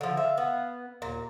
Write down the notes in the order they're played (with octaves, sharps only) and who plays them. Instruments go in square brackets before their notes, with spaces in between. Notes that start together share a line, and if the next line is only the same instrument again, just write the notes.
[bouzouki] D3 F3
[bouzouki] E5 [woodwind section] F5
[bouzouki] B3
[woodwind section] D#2 [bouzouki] A#2